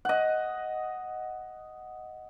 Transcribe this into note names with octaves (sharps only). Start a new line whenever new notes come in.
D#5 F#5